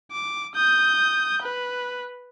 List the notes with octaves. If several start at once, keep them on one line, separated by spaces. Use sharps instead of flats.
D6
D#6 G6
B4